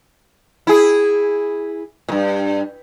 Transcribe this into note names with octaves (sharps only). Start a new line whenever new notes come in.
E4 G#4
G2 A#2